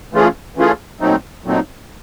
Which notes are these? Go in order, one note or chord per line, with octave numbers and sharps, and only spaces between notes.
E3 A3 C#4 F4 G#4
E3 A3 C#4 F4 G#4
A#2 F#3 A3 C4 D#4
A#2 F#3 A3 C4 D#4